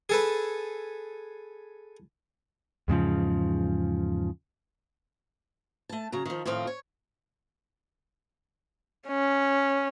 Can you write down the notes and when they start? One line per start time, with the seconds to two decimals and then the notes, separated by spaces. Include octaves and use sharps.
0.09 G#4 A4 B4
2.88 E2 G#2 C#3 F3
5.89 A3 A5
6.12 C#3 F#3 A#5
6.26 D#3 F3
6.46 A2 D#3 F3 C4 F4
6.67 C#5
9.08 C#4